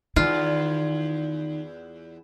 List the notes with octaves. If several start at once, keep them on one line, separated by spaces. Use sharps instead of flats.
E2 D#3 F4